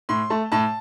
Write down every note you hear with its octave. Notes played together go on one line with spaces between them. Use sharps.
A2 C6
A3 A5
A2 A5